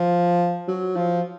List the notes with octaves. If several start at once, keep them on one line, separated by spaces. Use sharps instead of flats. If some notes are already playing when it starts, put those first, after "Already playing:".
Already playing: F3
F#3
F3